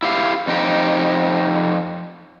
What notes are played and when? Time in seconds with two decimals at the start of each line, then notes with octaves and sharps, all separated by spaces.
0.03 E4 G4 F5
0.47 F2 D#4 G4